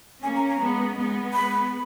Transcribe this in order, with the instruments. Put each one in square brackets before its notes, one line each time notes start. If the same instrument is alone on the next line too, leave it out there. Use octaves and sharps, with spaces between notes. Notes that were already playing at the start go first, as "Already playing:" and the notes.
[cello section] A#3 C#4 [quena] G#5
[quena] A#5
A#5
[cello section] G#3 B3
G#3 B3
[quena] B5